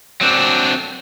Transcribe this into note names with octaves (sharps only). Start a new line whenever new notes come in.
F#3 C4 D4